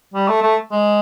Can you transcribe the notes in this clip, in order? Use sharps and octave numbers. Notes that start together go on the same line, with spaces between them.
G3
A3
A3
G#3